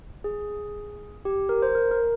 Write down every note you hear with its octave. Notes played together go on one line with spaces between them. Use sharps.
G#4
G4
A#4
C5
A#4
A#4